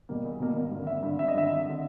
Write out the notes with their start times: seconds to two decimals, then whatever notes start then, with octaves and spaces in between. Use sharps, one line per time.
0.09 B2 G3 A#3
0.24 E2
0.40 B2 G3 A#3
0.55 G#1
0.71 G2 D3
0.87 G#1 E5
1.03 G2 D3
1.19 G#1 E5
1.28 D#5
1.34 G2 D3 E5
1.50 G#1
1.69 D3